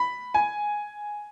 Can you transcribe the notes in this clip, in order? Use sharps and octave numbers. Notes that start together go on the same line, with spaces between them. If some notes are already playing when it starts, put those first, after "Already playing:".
Already playing: B5
G#5